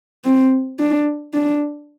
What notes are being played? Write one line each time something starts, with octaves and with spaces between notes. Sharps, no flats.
C4
D4
D4